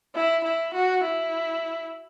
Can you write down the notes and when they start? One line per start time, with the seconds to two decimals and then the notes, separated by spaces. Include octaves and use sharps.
0.15 E4
0.44 E4
0.74 F#4
1.03 E4